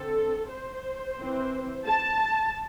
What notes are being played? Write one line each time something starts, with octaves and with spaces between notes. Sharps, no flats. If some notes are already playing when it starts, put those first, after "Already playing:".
Already playing: D3 C4 A4
C5
E3 C4
A5